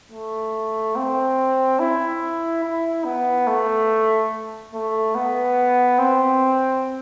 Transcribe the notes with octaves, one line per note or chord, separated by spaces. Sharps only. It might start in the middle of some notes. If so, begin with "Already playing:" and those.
A3
C4
E4
E4
B3
A3
A3
B3
C4